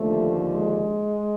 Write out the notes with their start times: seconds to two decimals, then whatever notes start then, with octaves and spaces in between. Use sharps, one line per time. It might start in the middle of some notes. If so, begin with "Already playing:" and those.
Already playing: D#2 D3 F3 A3
0.52 G#3